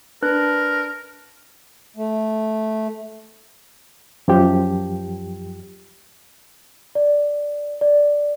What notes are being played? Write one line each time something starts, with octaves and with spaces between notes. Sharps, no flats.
D4 A#4 B4 F#6
A3
F#2 F3 G4
D5
D5